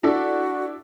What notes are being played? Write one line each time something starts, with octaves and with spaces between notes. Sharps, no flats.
D4 E4 F#4 A4